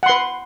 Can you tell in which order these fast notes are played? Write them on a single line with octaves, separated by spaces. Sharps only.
F#5 C6 B4